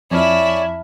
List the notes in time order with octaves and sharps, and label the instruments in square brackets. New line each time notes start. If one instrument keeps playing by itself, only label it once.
[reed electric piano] F2 A5 F6 [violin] E4 [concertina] C#5 D5 G#5